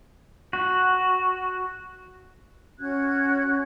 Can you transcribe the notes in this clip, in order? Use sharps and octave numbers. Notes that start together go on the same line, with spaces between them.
F#4
C#4 F#4 F#6 G#6